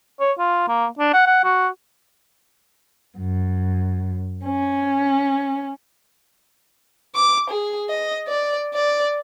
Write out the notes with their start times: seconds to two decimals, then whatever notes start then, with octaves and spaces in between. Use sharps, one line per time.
0.20 C#5
0.38 F4
0.68 A#3
0.99 D4
1.14 F#5
1.26 F#5
1.44 F#4
3.18 F#2
4.46 C#4
7.15 D6
7.50 G#4
7.90 D#5
8.28 D5
8.74 D5